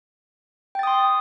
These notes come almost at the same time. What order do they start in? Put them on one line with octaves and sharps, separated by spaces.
G5 A6 D#6 C6